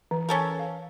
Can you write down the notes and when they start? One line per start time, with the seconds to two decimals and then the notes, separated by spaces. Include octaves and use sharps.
0.11 E3
0.29 C#4 A4 A#4
0.59 F5